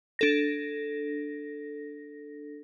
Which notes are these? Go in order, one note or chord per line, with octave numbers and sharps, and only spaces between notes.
D4 A4 A#6